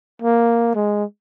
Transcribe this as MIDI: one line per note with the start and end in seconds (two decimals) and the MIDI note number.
0.22 0.73 58
0.75 1.04 56